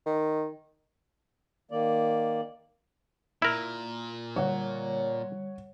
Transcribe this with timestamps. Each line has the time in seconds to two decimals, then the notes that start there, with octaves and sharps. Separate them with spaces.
0.06 D#3
1.71 D#3 A#3 D5
3.42 A#2 E4 A#4
4.36 D3 G3 C#5 F#5